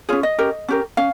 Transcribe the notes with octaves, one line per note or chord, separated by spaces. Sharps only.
C#4 F4 G#4 C#5
D#5
C#4 G4 A#4
C#4 G4 A#4
C#4 F5